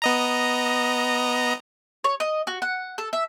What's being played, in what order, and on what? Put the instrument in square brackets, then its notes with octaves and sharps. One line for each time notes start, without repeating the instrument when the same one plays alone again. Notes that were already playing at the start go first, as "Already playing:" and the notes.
[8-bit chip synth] B3 D#5 A#5
[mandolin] C#5
D#5
F#4
F#5
A4
E5